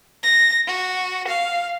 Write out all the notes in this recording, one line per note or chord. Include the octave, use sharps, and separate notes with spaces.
A#6
F#4
F5